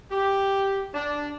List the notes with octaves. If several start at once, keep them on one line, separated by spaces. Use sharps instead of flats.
G4
D4